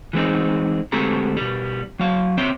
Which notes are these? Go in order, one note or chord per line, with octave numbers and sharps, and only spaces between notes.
E3 G#3 C4 D#4
D2 G#3 C4 G4 A4 A#5
B2 G3
F#3 F5
C4 C#5 E5 G5 C6